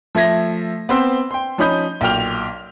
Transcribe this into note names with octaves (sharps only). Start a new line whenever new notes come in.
F3 A3 E5 G#6 A#6
B3 C4 C6 E6
G5 C6
F3 C#4 D#4 B5 D#6 G6
B1 A#2 G5 F6 F7